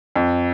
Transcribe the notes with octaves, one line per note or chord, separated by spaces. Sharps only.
F2